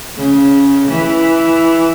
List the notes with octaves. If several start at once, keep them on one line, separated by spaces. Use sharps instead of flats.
C#3
E3